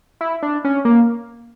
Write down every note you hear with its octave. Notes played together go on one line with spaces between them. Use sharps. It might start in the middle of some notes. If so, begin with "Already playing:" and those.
E4
D4
C#4
A#3